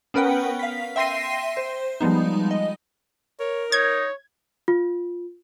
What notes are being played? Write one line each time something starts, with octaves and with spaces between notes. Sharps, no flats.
B3 C#4 A#4 B4 F#5 G5
F5 B6
E5 G5 C6 A#6 C7 D#7
C5
F3 G3 G#3 B3 D#4
D#5
A#4 C#5
D#4 C#5 G#6
F4